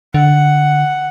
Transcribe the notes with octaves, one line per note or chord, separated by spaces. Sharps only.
D3 F#5